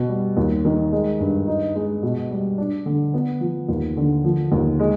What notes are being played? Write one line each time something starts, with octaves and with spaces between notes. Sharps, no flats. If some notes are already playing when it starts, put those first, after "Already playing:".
Already playing: B2
G3
D#2
D#3
G#3
G2
D#4
G#3
B2
G3
D4
D3
B3
F3
D#2
D3
F3
D#2
G#3